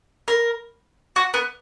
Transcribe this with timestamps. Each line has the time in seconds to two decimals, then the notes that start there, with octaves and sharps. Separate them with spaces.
0.28 A#4
1.16 F#4
1.34 B3